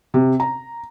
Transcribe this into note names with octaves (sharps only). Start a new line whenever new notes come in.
C3
A#5